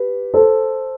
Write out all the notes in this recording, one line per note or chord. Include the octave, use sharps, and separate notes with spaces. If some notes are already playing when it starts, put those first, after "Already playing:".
Already playing: G4 B4
A4 C5